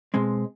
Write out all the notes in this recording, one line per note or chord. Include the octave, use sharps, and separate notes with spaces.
B2 G#3 C4